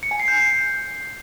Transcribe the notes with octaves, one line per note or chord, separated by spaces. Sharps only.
C#7
G#5
C7
G6
C7